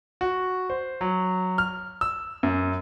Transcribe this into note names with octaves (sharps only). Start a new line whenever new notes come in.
F#4
C5
F#3
F6
E6
F#2